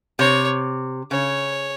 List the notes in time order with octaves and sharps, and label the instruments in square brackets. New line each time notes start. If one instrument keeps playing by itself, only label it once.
[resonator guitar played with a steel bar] C3 [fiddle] C#5
[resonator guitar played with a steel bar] C#3 [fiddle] C#5